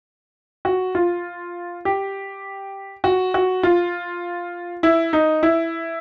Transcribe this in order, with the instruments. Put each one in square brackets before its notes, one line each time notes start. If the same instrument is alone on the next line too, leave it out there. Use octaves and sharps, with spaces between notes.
[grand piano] F#4
F4
G4
F#4
F#4
F4
E4
D#4
E4